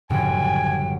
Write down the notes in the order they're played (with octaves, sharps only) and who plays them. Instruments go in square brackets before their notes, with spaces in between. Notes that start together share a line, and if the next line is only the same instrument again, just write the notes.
[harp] G1 F#2 [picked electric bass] A2 C#3 F3 [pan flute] G5 [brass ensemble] G#5